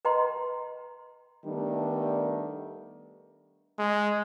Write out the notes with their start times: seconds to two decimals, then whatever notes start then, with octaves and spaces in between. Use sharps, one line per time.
0.05 B4 D#5 G5 A#5 C6
1.45 D#3 G3 A3 B3 D4
3.79 G#3